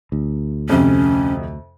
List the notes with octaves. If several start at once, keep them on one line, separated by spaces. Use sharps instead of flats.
D2
F2 C3 C#4